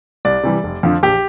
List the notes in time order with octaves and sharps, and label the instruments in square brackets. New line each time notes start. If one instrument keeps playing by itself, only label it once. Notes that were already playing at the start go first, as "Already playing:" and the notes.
[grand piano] C2 D5
C3 E3 G3
F1
F2 D3 F3
A#1 G4